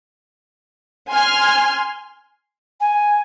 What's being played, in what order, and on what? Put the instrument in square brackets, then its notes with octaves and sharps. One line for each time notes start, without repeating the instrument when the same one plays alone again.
[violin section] G#5 C6 F6
[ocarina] G#5